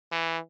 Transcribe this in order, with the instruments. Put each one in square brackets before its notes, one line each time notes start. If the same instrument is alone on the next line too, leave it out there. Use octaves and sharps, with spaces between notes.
[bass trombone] E3